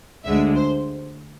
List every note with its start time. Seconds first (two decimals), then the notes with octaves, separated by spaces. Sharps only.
0.25 D2 D3 G#3 E5
0.56 C5